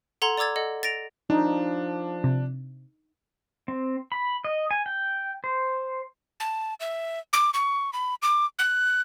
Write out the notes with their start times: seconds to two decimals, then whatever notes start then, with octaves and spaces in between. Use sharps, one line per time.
0.22 A4 F#5 A#5 C6 G#6 G7
0.38 D5 A#5 D6 E6 G#6 A6
0.56 A4 D#5 F#5
0.83 A6 A#6 D7 F7
1.30 F3 D4 D#4
2.24 C3
3.68 C4
4.12 B5
4.44 D#5
4.71 G#5
4.86 G5
5.44 C5
6.40 A5
6.80 E5
7.33 D6
7.54 C#6
7.93 B5
8.22 D6
8.59 F#6